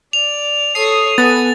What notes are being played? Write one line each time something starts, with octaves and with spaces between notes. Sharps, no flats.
D5 F7
A4 C#5 D#6 C7
B3 A4 G#5 A6